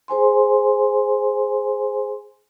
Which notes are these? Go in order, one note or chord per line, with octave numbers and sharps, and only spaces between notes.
G#4 C5 G#5 C6